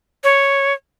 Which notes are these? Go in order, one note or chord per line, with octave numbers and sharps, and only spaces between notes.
C#5